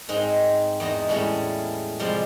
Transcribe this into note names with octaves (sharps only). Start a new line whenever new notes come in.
G#2 G#3 C4 D#4
E2 E4 D#5 A#5
A2 G3 G#3 C#4 E4
C3 F3 G3 G#3 F5 C6